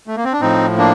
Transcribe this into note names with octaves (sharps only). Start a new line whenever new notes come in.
A3
A#3
C4
D4
A2 F3 C4 D#4
A#3 D4